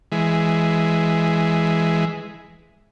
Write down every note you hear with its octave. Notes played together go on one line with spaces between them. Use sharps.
E3 G#3